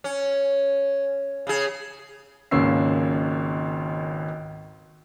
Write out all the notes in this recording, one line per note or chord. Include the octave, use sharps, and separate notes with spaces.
C#4
C#3 G#4
G#1 C#2 A#3 C#4 E6 C7